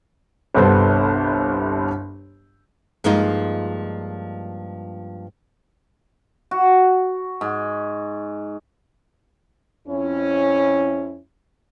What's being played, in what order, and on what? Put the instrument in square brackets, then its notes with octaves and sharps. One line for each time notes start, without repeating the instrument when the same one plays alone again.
[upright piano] G1 C2 G2 B3 A4 C5
[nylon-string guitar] G2 F3 G#3 A#3 D#4 F4
[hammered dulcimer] F#4
G#2
[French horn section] F2 C#4 E4